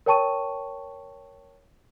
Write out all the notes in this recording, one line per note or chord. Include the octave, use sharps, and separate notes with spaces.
A#4 C#5 G5 A5 C#6 D#7